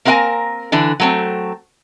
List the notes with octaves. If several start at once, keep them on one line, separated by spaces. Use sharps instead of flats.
A#3 C4 A#4 F5 G#5 A#5
D3 E3 D4
F#3 A3 C4